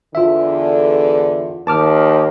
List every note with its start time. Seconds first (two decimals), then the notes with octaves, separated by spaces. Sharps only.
0.15 E2 D3 F4 E5
1.67 D#2 A5 D6 F6